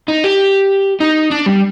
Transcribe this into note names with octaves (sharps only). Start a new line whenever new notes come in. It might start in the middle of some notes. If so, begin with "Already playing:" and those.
D#4
G4
D#4
D4
G3